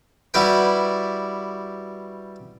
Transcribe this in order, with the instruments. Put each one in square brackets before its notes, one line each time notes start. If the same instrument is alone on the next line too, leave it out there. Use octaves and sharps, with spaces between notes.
[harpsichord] G3 E4 F#4 G4 B4 G5